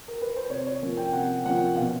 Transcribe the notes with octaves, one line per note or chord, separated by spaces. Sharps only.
A#4
B4
C5
C3 C#5
C#5
F3 A#3 C#4
G5
C3 F#5
F3 A#3 C#4 F#5
B2 F5